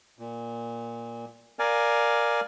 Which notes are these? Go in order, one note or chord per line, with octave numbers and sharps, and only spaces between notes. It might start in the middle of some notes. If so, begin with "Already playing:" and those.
A#2
A#4 D5 F5 G#5